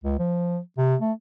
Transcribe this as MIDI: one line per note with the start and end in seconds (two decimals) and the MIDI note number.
0.04 0.16 37
0.19 0.59 53
0.77 0.95 48
1.01 1.12 57